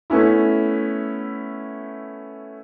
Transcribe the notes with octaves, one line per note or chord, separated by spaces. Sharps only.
A3 B3 C#4 E4